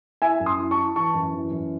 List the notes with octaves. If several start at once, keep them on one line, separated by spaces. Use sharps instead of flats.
E4 E5 G#5
F#2
C6 D#6
E4
A5 C#6
E4
E3 A5 C#6
F#2
E3
F#2